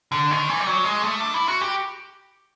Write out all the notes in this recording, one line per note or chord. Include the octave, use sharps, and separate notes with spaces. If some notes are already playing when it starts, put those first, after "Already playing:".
D3
D#3
E3
G3
F#3
G#3
A3
D4
E4
F#4
G4